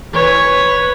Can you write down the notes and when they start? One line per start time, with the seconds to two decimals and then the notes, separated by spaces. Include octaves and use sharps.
0.13 E3 B4 C#5
0.44 B4